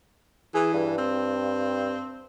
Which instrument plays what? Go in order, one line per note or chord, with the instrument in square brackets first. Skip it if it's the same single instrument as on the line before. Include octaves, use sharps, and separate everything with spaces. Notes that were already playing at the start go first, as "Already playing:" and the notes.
[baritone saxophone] E3 [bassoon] G#4
[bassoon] G2
[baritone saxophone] C4